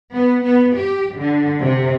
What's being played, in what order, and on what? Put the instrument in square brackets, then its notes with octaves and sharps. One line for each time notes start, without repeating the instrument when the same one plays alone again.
[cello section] B3
B3
G4
D3
C3